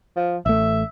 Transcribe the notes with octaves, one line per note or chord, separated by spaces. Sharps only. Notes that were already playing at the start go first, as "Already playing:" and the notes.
F3
A1 A3 E5